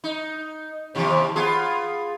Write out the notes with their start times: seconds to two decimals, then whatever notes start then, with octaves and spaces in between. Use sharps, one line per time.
0.04 D#4
0.95 D#2 C3 F3
1.36 B3 F4 G#4